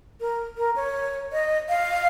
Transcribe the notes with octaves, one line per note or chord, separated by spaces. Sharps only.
A#4
A#4
C#5
D#5
F5